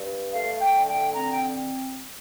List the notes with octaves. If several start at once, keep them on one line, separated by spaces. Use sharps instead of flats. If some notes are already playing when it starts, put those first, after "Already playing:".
Already playing: G2
A3 F5
G5
D3
G5
C4 A#5
G5